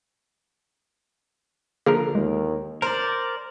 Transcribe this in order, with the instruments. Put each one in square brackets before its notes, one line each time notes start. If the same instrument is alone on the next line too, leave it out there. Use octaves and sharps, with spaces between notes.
[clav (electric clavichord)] D3 F3 A#4 [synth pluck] A#3 G#4
[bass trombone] D#2 [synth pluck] G#3
[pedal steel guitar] A#4 D5 [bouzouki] C5